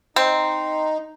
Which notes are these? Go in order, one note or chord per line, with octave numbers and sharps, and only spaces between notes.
C4 D#4